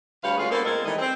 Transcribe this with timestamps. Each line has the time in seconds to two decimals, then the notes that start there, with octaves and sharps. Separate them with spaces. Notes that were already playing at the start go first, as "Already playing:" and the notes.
0.22 D2 G3 B4 C#5 F5
0.38 G#3 A3 C#4 F4 F#4 G#4
0.51 A#3 B3 D4 A4 A#4 C5
0.64 A#2 G#3 C4 A4 A#4 D#5
0.85 D#3 E3 G3 A3 D#5
0.98 C4